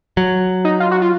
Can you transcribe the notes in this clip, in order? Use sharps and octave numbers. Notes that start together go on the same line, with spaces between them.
F#3
D#4
F4
F#4
F4